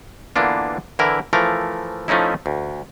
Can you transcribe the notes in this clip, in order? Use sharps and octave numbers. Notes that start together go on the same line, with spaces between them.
D3 E3 A#3 B3 D4 F4
D3 E3 E4 A#4
E3 F3 A3 A#4
F3 A3 C#4 D#4 E4
D2